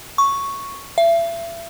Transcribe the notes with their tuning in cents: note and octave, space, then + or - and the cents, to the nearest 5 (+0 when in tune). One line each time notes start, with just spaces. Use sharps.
C#6 +0
E5 +35